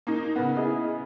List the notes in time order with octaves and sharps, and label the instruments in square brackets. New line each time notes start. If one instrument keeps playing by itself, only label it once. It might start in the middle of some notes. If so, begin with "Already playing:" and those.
[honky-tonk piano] A#3 D#4
[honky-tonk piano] C#3 B3 [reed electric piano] F#5
[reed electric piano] E4 G#4 D#5